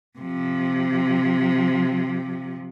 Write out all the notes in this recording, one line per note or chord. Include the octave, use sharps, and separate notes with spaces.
C3 F3